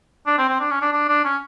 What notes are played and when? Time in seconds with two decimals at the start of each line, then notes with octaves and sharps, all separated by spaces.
0.27 D4
0.38 C4
0.48 C4
0.60 D4
0.70 C#4
0.82 D4
0.92 D4
1.08 D4
1.25 C#4